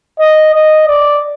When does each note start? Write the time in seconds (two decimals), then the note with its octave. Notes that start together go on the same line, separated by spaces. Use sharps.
0.20 D#5
0.54 D#5
0.88 D5